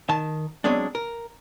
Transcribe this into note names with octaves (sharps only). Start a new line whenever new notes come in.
D#3 A5
F#3 G#3 B3 C4 D4
A#4